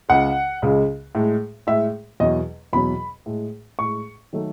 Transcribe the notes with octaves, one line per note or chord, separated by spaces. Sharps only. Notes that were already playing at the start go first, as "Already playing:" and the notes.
C#2 C#3 G#3 F#5
C#2 C#3 G#3
A2 G#3
A2 G#3 E5
E2 B2 F#3 D#5
E2 B2 F#3 B5
A2 G#3
A2 G#3 C#6
D#3 F#3 A3